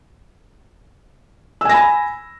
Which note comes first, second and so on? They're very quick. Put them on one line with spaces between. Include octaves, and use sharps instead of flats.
E6 G#5 A#6 B5